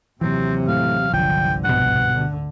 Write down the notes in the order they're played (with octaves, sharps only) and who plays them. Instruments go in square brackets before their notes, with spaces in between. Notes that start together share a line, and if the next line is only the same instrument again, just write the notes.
[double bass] D#2 C3 [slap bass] E3 F#3 [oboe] C4
[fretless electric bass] A2 [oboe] F5
[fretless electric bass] G1 C2 F3 [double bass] D3 [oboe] G5
[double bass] G#1 [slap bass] G2 B2 [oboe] F#5
[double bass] D2 D3